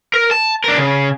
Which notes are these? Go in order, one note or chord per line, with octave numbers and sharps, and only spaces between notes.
A#4
A5
D4 A#4
C#3